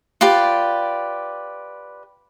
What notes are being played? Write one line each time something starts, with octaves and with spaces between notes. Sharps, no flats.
F4 G4 B4 D5